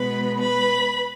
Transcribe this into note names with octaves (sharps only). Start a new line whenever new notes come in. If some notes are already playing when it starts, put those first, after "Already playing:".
Already playing: B2 G#3 B3 B4 B5
B4 B5